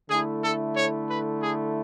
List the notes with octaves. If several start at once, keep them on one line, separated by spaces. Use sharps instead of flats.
D3 A3 E4 G#4
A4
C#5
B4
G#4